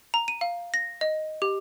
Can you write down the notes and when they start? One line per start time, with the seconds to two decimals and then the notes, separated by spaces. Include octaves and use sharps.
0.14 A#5
0.28 D#7
0.41 F5
0.74 A#6
1.01 D#5
1.42 G4